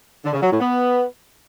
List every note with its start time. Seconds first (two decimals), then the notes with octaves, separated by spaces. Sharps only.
0.25 D3
0.33 C#3
0.42 F#3
0.51 A2
0.60 B3